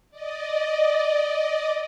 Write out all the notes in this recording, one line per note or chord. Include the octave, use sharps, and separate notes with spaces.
D5 D#5